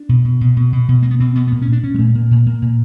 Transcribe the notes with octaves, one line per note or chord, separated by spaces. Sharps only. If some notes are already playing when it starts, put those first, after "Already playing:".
Already playing: D4
B2
B2
B2
B2
B2
B2
B2 A#3
B3
B2 C4
B2 B3
B3
A#2 A#3
C#4
A#2
D4
A#2 C#4
G#3
A#2 A3
A#2 A#3
A#2
A#2 A#3
A#2